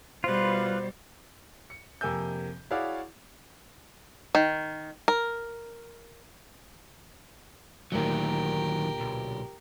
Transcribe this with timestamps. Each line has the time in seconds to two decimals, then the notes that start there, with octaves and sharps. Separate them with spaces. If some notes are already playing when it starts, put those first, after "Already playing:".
0.24 B2 G3 F4 B4 C5
1.70 C#7
2.01 F2 C3 A#3 G#5 E6 G6
2.71 E4 F#4 G#4 C#5 D5 F5
4.35 D#3
5.08 A#4
7.92 D2 A#2 D#3 F#3 G4 A#4
9.00 B1